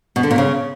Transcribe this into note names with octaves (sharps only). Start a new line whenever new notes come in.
B2
D3
A#2
C#3